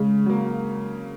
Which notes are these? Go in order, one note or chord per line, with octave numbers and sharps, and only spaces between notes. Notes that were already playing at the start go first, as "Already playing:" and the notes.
Already playing: C#3 G#3
F#3 A#3